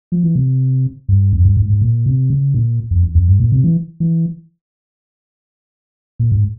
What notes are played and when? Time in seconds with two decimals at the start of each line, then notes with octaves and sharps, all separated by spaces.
0.12 F3
0.23 E3
0.36 C3
1.09 G2
1.33 F2
1.45 G2
1.57 G#2
1.70 G#2
1.81 A#2
2.06 C3
2.30 C#3
2.54 A#2
2.91 F2
3.03 E2
3.15 F2
3.28 G2
3.40 A#2
3.52 C3
3.64 E3
4.00 E3
6.19 A#2
6.32 G#2